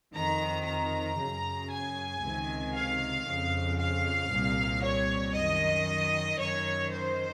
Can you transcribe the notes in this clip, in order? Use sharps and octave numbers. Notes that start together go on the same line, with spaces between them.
F2 D#3 A#5
A#5
F#2 C#3
G#5
C#2 C3 D#3
F5
F2 C#3
F5
C2 A#2
C#5
F#2 D#3 D#5
F#2 D#3 C#5
C5